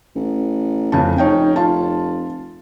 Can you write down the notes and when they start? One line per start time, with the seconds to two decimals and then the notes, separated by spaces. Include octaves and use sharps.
0.15 A1
0.92 A1 F2 C#3 A5
1.18 F1 C#4 D#4 G5
1.56 F4 A5